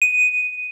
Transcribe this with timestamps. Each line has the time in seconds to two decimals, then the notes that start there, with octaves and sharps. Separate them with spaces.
0.02 D#7